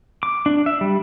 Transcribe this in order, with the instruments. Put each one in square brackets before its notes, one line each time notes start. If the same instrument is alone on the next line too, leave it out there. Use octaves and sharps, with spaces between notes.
[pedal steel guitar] D6
D4
E5
G3